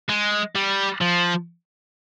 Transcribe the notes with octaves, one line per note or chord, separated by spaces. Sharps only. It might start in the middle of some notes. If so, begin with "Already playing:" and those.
G#3
G3
F3